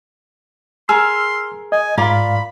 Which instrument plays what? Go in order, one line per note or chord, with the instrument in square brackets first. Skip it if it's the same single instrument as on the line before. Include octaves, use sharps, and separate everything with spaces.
[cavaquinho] G#4 A#4 [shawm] C6 [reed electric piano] E6 F6
[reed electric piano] D#5 [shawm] G#5
[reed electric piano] G#2 F5 [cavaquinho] F4 A#4 D5 [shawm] B5